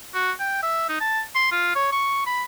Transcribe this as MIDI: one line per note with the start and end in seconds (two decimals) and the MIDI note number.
0.14 0.31 66
0.40 0.61 79
0.63 0.85 76
0.89 0.97 63
1.00 1.21 81
1.35 1.49 84
1.51 1.71 65
1.75 1.87 73
1.92 2.22 85
2.26 2.43 83